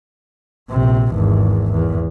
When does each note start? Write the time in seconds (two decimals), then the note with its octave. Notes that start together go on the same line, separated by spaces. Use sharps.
0.70 A#1 C3
1.14 G#1 E2
1.72 E2